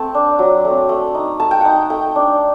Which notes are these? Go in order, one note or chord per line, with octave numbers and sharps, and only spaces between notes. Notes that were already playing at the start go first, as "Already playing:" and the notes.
Already playing: A3 C4 G5 A5
D4
F#3
A3 C4
A3
D#4
A3 A5
G5
D#4 F#5
G5
A3 G5
D4